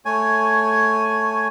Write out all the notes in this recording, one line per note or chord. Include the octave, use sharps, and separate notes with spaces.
A3 C#5 G#5